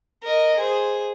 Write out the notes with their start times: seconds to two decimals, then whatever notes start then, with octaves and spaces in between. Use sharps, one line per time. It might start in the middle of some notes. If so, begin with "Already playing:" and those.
0.23 A#4 D#5
0.57 G#4 C5